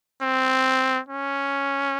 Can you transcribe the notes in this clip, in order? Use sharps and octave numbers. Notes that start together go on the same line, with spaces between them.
C4
C#4